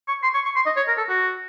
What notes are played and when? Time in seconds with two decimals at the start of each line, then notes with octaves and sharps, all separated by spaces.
0.08 C#6
0.23 C6
0.35 C#6
0.45 C#6
0.56 C6
0.66 D#5
0.76 C#5
0.88 A#4
0.98 A4
1.09 F#4